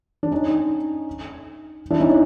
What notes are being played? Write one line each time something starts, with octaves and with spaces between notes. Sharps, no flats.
D4
C#4 D#4
D4 E4
C#4 D#4